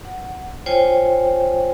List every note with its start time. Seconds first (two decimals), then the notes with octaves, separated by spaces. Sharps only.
0.05 F#5
0.66 F4 C5 C#5 G5 G#5